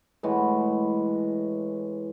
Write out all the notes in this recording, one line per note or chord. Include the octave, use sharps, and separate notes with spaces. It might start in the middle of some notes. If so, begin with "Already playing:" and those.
A2 E3 G#3 F#4